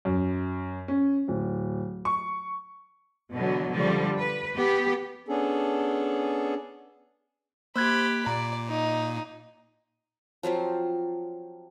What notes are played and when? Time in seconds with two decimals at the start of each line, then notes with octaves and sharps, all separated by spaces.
0.05 F#2
0.88 C#4
1.28 D1
2.05 C#6
3.33 B2 D3 E3 F#3
3.70 D3 F3 G3
4.17 B4
4.55 B3 G4
5.28 B3 C#4 D4 G#4 A4
7.76 A#3 G4 C5 B5 F#6 G#6
8.26 A#2 D5 A#5
8.68 D#4
10.43 F3 F#3 C4 F4